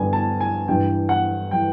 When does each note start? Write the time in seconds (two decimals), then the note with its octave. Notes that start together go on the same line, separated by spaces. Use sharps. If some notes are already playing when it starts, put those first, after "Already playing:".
Already playing: G2 D3 G3 B3 G#5
0.13 A5
0.41 G#5
0.68 G2 E3 G3 G5
1.09 F#5
1.51 E3 G3 G5